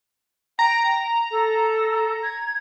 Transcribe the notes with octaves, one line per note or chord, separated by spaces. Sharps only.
G5 A#5
A4
G#6